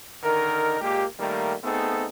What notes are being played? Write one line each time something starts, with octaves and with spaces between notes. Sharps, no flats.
D3 D#3 D#4 A#4
A#2 G#3 A#3 G4
D#3 G3 A3 A#3
A3 B3 C4 D#4 G#4 A4